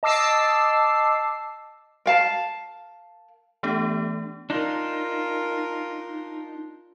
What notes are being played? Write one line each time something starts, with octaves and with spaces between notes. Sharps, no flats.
D#5 A5 D6 E6 C7
A#4 F5 A5
E3 A3 B3 D4 G4
D4 D#4 F4 A#4